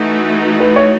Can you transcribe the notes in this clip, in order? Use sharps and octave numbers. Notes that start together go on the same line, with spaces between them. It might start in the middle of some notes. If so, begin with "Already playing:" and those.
Already playing: E3 A3 D#4 F#4
B4
C#5